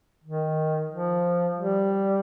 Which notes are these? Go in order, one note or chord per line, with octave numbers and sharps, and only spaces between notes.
D#3
F3
G3